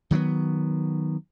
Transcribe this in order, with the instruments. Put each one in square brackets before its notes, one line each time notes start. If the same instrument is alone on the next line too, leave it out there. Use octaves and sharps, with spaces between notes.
[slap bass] D#3 F#3 G#3 B3